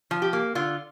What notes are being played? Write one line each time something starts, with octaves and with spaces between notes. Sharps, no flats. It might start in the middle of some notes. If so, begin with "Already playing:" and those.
F3
G4
A#3
D3 F4